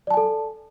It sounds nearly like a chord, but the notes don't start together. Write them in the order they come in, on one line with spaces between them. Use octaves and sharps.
D5 A5 G#5 A4